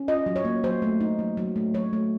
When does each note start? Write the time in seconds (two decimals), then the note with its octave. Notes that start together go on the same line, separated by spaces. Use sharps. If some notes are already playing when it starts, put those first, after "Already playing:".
Already playing: C#4
0.08 F4 D#5
0.26 F#3
0.36 C#5
0.45 A#3
0.64 F#3 C5
0.82 A3
1.00 D#4
1.19 F#3
1.37 F#3
1.56 A3
1.74 F#3 C#5
1.93 A3